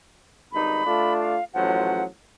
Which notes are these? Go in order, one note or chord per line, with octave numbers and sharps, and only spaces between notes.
G#1 G2 D#4 B5
A3 D4 F4
F5
A1 F3 F#3 F#5